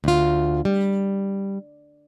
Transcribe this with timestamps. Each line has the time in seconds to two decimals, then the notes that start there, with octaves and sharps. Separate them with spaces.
0.04 D2 F4
0.65 G3